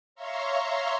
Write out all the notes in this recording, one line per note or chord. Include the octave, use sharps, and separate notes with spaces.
C#5 E5 F5 A#5 C6 C#6